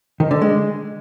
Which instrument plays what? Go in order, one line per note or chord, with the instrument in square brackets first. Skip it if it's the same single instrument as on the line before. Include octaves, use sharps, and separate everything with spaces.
[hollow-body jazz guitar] D#3
D3
G#3